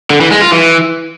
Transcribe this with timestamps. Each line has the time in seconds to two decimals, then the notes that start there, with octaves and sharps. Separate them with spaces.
0.10 D3
0.21 E3
0.31 G#3
0.41 F4
0.52 E3